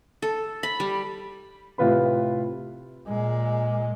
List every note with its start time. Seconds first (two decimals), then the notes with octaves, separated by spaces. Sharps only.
0.22 A4
0.63 B5
0.80 G3
1.78 A2 C3 F4 B4 B5
3.08 A#2 G#3